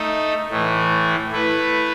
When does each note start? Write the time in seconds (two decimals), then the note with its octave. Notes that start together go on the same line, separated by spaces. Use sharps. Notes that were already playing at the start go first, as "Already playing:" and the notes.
Already playing: A3 D#4 A4
0.50 A2 E3 A3
1.32 A3 E4 B4